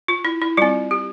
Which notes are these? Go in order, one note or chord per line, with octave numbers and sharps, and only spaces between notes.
F4
E4
E4
G3 C4 F4
G4